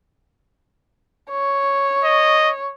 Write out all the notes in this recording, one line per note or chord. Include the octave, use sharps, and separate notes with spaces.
C#5
D#5